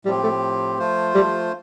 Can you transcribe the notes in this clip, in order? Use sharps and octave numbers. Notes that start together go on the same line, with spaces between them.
A2 F3 G3 C4 G4
A3
F3 A3 F4 C5
G3